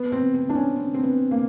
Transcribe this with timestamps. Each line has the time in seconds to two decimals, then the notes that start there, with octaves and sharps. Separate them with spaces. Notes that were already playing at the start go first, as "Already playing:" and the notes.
Already playing: B3
0.12 C4
0.34 C4
0.49 D4
0.55 C#4
0.76 C4
0.94 C4
1.03 B3
1.31 A#3